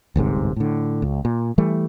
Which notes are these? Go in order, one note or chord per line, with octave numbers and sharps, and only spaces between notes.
D1 G1 G#2 C3
A2 D3
C#2
A#2
E3 G3 A3